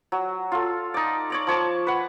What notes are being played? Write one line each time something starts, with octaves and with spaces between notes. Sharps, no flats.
F#3
F4 A4
D#4 D5
C#5 D5 A#5
F3 C#5 A5 D6
B4 F#5